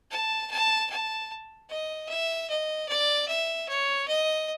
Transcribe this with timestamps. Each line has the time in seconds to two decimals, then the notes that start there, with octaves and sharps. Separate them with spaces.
0.11 A5
0.51 A5
0.90 A5
1.70 D#5
2.09 E5
2.50 D#5
2.89 D5
3.28 E5
3.69 C#5
4.08 D#5